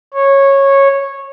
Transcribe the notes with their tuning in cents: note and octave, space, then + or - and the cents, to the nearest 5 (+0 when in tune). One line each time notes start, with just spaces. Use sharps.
C#5 -10